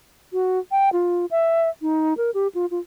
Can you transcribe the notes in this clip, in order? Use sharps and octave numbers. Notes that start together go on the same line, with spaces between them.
F#4
G5
F4
E5
D#4
A#4
G4
F4
F4